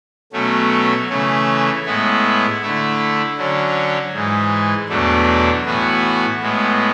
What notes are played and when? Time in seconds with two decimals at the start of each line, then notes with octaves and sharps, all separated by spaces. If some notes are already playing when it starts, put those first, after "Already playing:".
0.32 B2 F#3 A3 C#4
1.09 C#3 E3 A3 C#4
1.85 A2 G#3 B3 E4
2.61 D3 A3 E4
3.37 D3 F#3 C#4
4.13 G#2 E3 G#3
4.89 E2 B2 F#3 A3 D4
5.65 A2 E3 B3 F#4
6.41 A2 G#3 B3